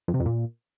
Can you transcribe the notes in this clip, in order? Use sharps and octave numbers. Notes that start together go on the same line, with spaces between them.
F2
C3
F2
A#2